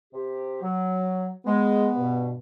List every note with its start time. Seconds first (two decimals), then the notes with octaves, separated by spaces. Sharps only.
0.13 C3 G4
0.62 F#3
1.46 G#3 B3
1.95 G2 B2